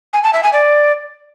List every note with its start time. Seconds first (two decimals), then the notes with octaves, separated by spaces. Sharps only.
0.13 G#5
0.23 A5
0.33 E5
0.43 G#5
0.53 D5